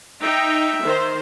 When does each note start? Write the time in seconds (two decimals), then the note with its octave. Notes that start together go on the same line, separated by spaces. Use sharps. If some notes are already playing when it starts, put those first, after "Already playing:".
0.22 D#4 E5 G5
0.85 D#3 C5